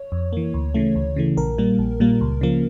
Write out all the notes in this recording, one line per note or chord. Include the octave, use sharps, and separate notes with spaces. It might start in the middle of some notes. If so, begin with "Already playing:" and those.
Already playing: C#5
F2
E3 A#3
D2
C#3 E3 A3
D2
C#3 E3 A3
A#1 A#4
A#2 G3 A#3
A#1
A#2 G3 A#3
C#2
C#3 F3 A#3